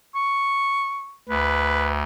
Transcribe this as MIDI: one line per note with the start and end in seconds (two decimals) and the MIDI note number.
0.15 1.16 85
1.29 2.03 38
1.29 1.92 71